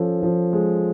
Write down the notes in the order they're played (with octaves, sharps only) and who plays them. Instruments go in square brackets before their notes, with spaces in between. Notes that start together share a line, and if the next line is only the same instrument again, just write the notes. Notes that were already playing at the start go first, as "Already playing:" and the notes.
Already playing: [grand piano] F3 C#4 A4
F3
G#3